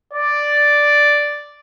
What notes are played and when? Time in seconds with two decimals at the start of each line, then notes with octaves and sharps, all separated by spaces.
0.14 D5